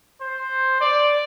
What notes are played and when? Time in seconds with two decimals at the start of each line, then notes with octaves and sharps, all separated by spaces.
0.21 C5
0.81 D5